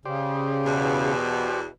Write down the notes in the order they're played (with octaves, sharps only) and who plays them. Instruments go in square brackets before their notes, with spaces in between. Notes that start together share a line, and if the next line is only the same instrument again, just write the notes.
[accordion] C#3 [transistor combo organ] G4 C5 D5
[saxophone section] E2 B2